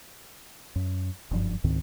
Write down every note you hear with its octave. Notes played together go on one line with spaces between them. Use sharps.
F#2
F#1 G2 F3
C#2 G#2 D#3 C4